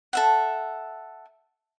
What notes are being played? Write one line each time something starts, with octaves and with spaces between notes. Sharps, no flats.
A4 E5 F#5